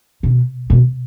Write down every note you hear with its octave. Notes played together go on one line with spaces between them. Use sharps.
B2
B2